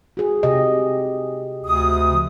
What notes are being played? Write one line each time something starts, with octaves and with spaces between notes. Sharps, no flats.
F#4 G#4
C3 G4 D#5
D2 D#6
C#3 F3